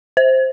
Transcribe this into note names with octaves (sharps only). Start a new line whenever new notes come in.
C5